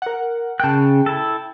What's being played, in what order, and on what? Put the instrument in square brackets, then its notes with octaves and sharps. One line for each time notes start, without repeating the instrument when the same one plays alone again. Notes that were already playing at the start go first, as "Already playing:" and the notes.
[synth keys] A#4 F#5
[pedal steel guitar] C#3 F#6 [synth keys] G5 A5
[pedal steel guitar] E4 A4